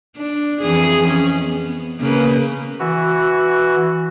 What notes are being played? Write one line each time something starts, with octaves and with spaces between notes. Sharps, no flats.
D4
F2 E3 G#4
C#4
B3
C#3 A#3 B4
E3 F#4